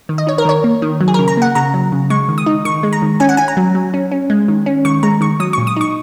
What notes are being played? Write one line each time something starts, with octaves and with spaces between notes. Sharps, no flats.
D#3
D#5
D#4 C#5
A#4
D#3 C#5
A#3
D#3
F#3
G#4
A#4
C#3
A#5
A#3 F#5
C#3 A#5
F#3
C#3
G#3 C#6
D#3
D#6
D#4
D#3 C#6
G#3
A#5
D#3
C#4 G#5
F#5
C#4 G#5
A#5
F#3
F#3
C#4
C#4
G#3
D#3
C#4
D#3 C#6
G#3 A#5
D#3 C#6
F#3 D#6
C#6
A#2
D#6
D#4 C#6